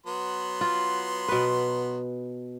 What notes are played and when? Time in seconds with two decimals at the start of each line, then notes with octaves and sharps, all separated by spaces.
0.07 F#3 B3 C6
0.61 F4
1.28 B2 B4